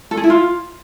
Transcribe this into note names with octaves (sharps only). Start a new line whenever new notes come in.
A4
G#4
E4
F4